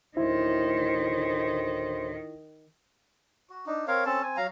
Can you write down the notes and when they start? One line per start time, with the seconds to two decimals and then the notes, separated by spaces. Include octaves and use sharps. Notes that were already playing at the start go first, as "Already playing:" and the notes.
0.17 D2 A2 D#3 E4 C5
3.50 F#4
3.66 D4 D#4
3.87 C4 A#4 C#5 F5
4.05 C4 C#4 A4 A5
4.22 C4 G#5
4.37 F#3 F5 A#5